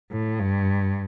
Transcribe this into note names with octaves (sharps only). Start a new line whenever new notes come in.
A2
G2